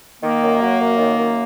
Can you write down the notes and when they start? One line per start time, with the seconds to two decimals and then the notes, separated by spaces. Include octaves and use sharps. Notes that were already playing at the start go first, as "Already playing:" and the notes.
0.22 D#3 A#3
0.42 F#2
0.61 F#3
0.79 F#2
0.98 D#3
1.17 F#2